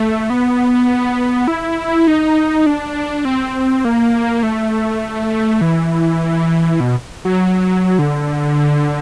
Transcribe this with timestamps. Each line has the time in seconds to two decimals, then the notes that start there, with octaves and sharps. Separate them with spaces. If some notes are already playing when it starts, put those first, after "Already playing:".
Already playing: A3
0.30 B3
1.48 E4
2.07 D#4
2.66 D4
3.25 C4
3.85 A#3
4.43 A3
5.61 E3
6.80 B2
7.25 F#3
7.99 D3